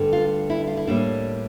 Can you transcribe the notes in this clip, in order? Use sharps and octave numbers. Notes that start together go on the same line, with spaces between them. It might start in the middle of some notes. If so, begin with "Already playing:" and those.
Already playing: G2 D3 A3
F4
E4
F4
E4
A2 G3 A#3 D4